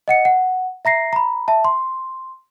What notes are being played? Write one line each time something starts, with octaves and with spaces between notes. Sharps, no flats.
D#5 F#5 C#7
F#5
E5 A#5 A#6 C7
A#5 B5
E5 A5
C6